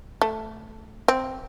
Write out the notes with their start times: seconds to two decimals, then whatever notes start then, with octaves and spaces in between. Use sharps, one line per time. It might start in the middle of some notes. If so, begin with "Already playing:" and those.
0.22 A3
1.08 C4